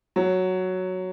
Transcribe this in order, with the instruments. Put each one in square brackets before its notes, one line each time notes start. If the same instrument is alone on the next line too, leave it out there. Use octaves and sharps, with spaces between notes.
[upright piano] F#3